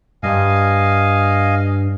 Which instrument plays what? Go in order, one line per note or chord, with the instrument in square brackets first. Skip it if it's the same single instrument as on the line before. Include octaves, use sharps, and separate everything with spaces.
[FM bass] G2 [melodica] D#5 F5 G#5